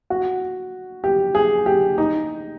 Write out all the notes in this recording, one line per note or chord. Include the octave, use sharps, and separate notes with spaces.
F#4
G4
G#4
G4
D#4